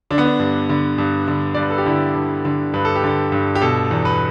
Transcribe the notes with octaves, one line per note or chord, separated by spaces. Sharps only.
D3 D4
B3
D4
G2
D3
G2
D3
G2 D5
B4
A4
G4
D3 E4
G2
D3
G2 B4
A4
G4
D3 A4
G2
G4
B2 A4
E2
B4